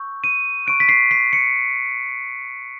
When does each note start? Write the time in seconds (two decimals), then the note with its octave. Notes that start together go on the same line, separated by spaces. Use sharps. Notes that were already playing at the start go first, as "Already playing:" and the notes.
Already playing: C#6 E6 G6
0.24 D#7
0.66 C#6 F#6 D7
0.80 B6
0.89 C7
1.11 C7
1.33 C#7